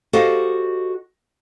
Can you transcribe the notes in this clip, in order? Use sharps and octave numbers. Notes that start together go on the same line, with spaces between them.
F#4 G4 A4 C5 D#5 F5